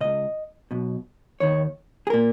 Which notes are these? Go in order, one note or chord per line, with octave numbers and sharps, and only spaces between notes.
C#2 B2 D#5
B1 B2
D#2 D#3 C#5
G#4
A#2 A#4